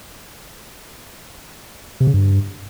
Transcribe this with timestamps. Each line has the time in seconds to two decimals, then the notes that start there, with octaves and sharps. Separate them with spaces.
2.00 C3
2.07 C#3
2.14 G2